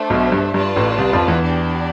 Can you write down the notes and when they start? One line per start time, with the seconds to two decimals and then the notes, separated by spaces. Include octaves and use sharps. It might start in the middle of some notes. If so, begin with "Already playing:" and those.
Already playing: A3 D4 A4 C5 E5
0.10 B1 B2
0.32 G2
0.54 G2 F4 B4 D5 A5
0.76 A1 A2
0.98 C2 C3
1.13 F2 F3
1.28 E2 E3
1.42 D4 G4 D5